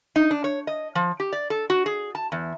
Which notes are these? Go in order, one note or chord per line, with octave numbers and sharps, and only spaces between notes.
D#4
D4
C#5
D#5
F3
G4
D5
A4
F#4
G#4
A5
E2